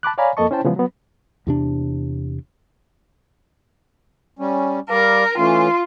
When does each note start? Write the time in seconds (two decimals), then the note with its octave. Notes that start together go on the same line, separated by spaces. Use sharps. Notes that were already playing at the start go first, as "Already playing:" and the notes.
0.03 A5 B5 D6 F#6
0.18 C#5 D5 F5 G#5 A#5 B5
0.37 F2 A#3 A4 D#5 A5 C#6
0.51 C#4 E4 C5 G5 A5
0.65 C#3 E3 F3 G3 G#3 B3
0.76 F#3 B3
1.47 E2 C3 D4
4.39 G3 C#4
4.90 G3 A#4 D5 F5
5.38 E3 A3 C#4 F4